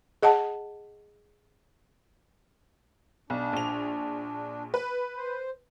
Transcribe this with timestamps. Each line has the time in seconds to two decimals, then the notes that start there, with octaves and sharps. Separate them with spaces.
0.23 G#4 D#5 F#5 A5
3.30 B1 D4
3.53 A#1 F7
4.74 B4
5.17 C5